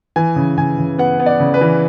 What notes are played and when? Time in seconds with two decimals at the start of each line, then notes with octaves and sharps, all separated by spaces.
0.16 E3 G#5
0.36 C#3
0.58 C#3 G#5
0.78 C#3
0.98 B3 F#5
1.20 B3
1.26 D5
1.40 C#3
1.54 B4
1.61 E3